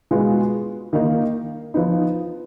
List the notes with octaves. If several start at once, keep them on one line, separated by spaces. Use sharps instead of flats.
B2 G#3 B3 F4
D#3 A#3 D#4
F3 B3 D#4